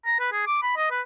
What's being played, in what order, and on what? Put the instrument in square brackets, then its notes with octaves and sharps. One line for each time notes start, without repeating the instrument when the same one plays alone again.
[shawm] A#5
B4
G#4
D6
B5
D#5
B4